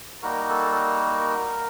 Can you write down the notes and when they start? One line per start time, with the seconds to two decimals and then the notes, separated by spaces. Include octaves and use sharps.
0.22 G3 A#3 D#4 F#4 A#4
0.49 A4
0.72 A4
0.75 A#4